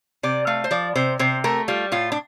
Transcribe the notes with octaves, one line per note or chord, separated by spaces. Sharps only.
C3 D5
A3 F5
C5
F3 D5
C3 C5
C3 C5
A3 A#4
G3 F4
A2 F4
D4